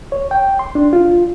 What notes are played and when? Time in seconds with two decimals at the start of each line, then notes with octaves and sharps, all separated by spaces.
0.12 C#5
0.31 G5
0.59 C6
0.75 D4
0.93 F4